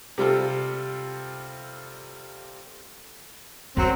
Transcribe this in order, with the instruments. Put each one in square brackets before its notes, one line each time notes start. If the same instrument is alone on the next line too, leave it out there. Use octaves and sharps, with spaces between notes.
[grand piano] C3 G3 F4 A4
[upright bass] F#2 [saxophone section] F#3 C4